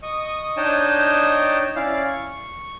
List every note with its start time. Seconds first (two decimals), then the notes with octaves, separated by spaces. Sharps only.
0.03 D#5 C#6 D#6
0.57 D4 D#4 C#5 D#5 G5 A5
1.76 C#4 E4 D5 F5
2.08 C#6